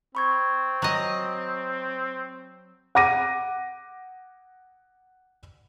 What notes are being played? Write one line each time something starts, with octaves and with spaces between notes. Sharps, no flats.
C4 B5 C#6 G#6
F#3 D#5
F#5 D6 A#6 D#7